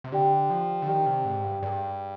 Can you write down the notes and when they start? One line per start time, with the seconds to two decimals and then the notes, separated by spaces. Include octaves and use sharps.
0.04 C3
0.12 D3 G4 D5 G5
0.50 F3
0.82 D3
0.87 D#3 G4 D5 G5
1.06 C3
1.25 G#2
1.44 G2
1.62 G2 G#4 D5 G5